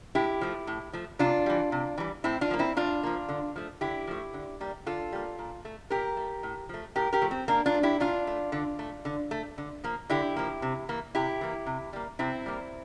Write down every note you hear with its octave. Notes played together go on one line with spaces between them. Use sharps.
A2 E4 G4
F3 A3
A2
F3 A3
C3 D4 F4
E3 G3
C3
E3 G3
A2 C4 E4
D4 F4
F3 A#3
C4 E4
A2 D4 F4
F3 A#3
D3
F3 A3
D3 E4 G4
F3 A3
D3
G3 A#3
D3 F4 A4
G3 A#3
A#2
A3
A#2 G4 A#4
A3
A2
F3 A3
A2 G4 A#4
G4 A#4
F3 A3
C4
A#2 A#3 D4
D4 F4
A3
E4 G4
A#2 D4 F4
A3
D3
A3
D3
A3
D3
F3 A#3
D3 E4 G4
F3 A#3
C3
E3 A#3
C3 E4 G4
E3 A#3
C3
G3 A#3
C3 C4 E4
G3 A#3